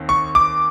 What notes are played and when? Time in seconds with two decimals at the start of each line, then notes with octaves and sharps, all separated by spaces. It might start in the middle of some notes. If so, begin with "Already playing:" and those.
Already playing: D#2 D#3 C4
0.09 C#6
0.35 D6